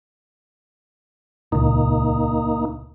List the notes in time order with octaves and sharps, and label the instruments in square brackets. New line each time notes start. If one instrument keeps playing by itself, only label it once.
[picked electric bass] D#1 C#2 A#2 [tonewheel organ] A#3 D#4